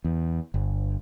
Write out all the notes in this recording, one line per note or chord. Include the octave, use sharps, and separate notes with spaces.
E2
G1